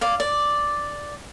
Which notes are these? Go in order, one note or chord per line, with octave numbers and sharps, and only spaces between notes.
D5 F5
D5